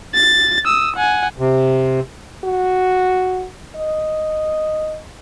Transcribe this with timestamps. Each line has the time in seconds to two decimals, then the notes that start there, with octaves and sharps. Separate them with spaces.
0.15 A6
0.66 D#6 E6
0.96 F#5 G#5
1.39 C3
2.44 F#4
3.76 D#5